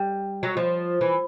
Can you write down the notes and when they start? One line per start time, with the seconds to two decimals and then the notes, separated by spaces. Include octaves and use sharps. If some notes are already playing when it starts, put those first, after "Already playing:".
Already playing: G3
0.43 F#3
0.57 F3
1.01 E3